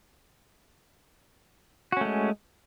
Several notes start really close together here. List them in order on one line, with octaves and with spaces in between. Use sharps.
F#4 C#4 A3 G#3